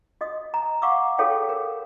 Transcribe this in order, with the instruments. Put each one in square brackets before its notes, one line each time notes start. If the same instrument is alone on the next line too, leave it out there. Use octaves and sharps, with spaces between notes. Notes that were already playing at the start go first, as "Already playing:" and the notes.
[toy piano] F#4 D#5 D#6
A#5
F5 F#5 A#5 C#6 D6 E6
F#4 G#4 A4 C#5 F5 G5
A#4